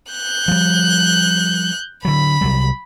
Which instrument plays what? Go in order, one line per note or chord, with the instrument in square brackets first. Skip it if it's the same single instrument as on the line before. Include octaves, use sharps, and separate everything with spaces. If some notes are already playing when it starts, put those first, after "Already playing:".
[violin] F#6 G6
[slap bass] F3 G3
[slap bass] D3 F#3 [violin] B5
[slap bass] C2 F#3 G3